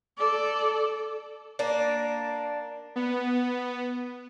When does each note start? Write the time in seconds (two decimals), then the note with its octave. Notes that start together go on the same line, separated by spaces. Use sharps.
0.18 A4 D5
1.59 A#3 D4
2.96 B3